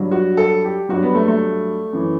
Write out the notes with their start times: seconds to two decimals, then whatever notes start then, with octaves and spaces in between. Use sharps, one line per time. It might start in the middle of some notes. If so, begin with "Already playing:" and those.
Already playing: G2 F#3
0.11 F#4
0.37 A4
0.64 G4
0.89 G2 F#3 F#4
1.02 B3
1.15 A3
1.28 A3
1.93 F#2 E3